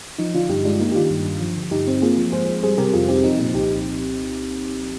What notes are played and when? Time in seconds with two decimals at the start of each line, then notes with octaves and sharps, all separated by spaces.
0.18 F3 D#4
0.34 D3 D4 F4
0.49 G2 D#4 G4
0.64 G#3 D4 F4
0.80 A#3 D#4
0.92 G4
0.95 D#3 D4 F4
1.10 G2
1.26 G2
1.41 F3
1.56 D3
1.71 G2 D#4 G4
1.87 C4
2.02 A#3 F4 G#4
2.18 F3
2.32 G#2 G#4 C5
2.48 G#2
2.63 G3 G#4 C5
2.78 C3 G4 A#4
2.93 F2 F4 G#4
3.09 C4 D#4 G4
3.24 F3 D#4
3.39 A#2 D#4
3.54 C2 D#4 G4